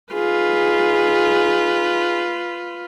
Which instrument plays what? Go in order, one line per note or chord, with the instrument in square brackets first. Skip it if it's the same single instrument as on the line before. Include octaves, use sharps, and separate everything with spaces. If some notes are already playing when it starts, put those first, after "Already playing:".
[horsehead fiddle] D#4 G#4 [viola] F4 B4